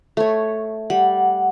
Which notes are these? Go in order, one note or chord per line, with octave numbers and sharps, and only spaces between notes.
A3 C#5
G3 F#5